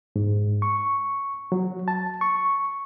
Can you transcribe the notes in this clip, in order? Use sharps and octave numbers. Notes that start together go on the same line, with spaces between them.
G#2
C#6
F#3
A5
C#6